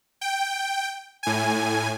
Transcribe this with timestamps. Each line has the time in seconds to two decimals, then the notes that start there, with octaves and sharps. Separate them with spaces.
0.21 G5
1.23 A2 G#5